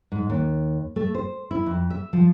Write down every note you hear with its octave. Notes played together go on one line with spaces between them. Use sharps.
G#2
D#2
A3
C5
E4
F2
E5
F3